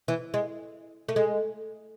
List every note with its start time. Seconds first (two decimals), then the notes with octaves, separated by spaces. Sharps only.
0.08 E3
0.34 G#3
1.09 A3
1.16 G#3